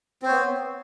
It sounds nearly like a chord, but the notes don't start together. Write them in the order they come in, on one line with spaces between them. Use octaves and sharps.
C4 C5 C#5 B3